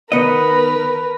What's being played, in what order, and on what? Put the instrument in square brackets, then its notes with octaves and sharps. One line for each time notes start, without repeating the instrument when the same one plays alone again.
[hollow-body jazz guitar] D#3 B3 D#5 [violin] A#4 B4